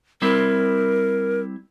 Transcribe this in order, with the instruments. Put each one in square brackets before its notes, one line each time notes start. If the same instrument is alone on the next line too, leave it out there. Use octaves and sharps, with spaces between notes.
[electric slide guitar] G3 C4 E4 [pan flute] A#4